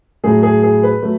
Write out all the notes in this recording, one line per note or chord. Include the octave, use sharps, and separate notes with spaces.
A2 F#3 A3 G#4
G#4
G#4
B4
F#3 A3